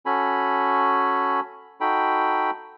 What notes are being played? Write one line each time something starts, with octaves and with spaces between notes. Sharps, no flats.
C#4 F#4 A4 G#5 B5
D#4 F#4 A4 G5 B5